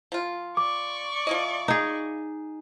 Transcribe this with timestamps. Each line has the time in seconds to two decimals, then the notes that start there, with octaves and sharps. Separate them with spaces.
0.12 F3 F4
0.57 D5 C#6 D6
1.27 F3 E4 D#5
1.68 D#4 G#4